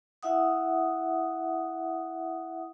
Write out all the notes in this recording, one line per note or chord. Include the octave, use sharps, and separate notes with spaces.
E4 E5 F#5 D#6